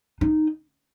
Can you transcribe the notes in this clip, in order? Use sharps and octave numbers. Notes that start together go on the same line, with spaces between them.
D#4